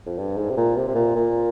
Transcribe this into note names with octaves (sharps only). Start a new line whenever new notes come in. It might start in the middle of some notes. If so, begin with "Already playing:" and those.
F2
G2
G#2
C3
A#2
C3
C3
A#2
A#2